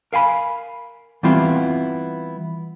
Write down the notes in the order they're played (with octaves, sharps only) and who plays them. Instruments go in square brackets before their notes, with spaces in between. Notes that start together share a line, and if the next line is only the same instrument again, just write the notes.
[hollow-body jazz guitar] A#4 F5 G#5 B5
E3 G3 B3 C4 E4 F4